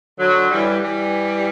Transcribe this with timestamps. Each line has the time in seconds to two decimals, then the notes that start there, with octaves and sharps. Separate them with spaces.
0.19 D3 F#3
0.51 E3 G3
0.83 E3 G3